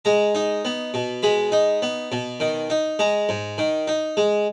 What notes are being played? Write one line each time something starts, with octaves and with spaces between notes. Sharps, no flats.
G#3 A#5
D#4
B3
B2
G#3 B5
D#4
B3
B2
D#3
D#4
G#3 A#5
G#2
D#3
D#4
G#3